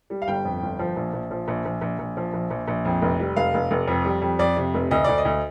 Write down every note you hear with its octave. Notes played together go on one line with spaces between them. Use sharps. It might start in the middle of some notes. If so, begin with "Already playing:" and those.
G3
F5
G1 G5
F2
G1
F3
A#1
A#1
F3
A#1
A#1
A#1
A#1
F3
A#1
A#1
A#1
F2
F1
G3
F1 F5
F1
F1
F2
G3
F2
F2 D5
C3
F1
D2 D#5
D2 D5
D#5
D2